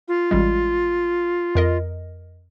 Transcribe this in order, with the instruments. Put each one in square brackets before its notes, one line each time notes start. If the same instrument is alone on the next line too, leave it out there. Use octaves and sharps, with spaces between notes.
[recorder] F4
[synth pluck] A1 G3 G#3
F2 A#4 D#5